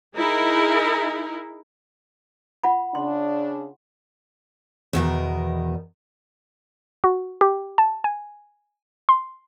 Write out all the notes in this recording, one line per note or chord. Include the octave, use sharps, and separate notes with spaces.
D#4 E4 G#4 A#4
F4 F#5 B5
C#3 D4 C6
E2 B2 D#3 A#4
F#4
G4
A5
G#5
C6